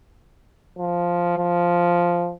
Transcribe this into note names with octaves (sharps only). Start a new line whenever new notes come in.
F3
F3